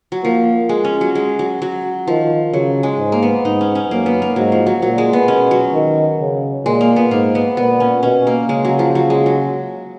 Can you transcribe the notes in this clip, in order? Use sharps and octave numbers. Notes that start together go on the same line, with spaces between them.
F#3
F3 A#3
G#3
C#4
F#3
G#3
F#3
F#3
D#3 F3
C#3 F#3
G#3
G#2
A#3
B3
G#2 D#4
C#4
C#4
F#2 A#3
B3
A#3
G#2 F#3
F3
F#3
A#2 F#3
G#3
B3
B2 C#4
F#3
D#3
C#3
A#2 G#3
A#3
B3
G#2 A#3
B3
A#2 B3
C#4
B2 C#4
A#3
C#3 G#3
F#3
F3
F#3
G#3
F#3